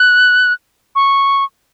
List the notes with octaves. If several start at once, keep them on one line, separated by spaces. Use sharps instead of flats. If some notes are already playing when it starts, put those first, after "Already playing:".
Already playing: F#6
C#6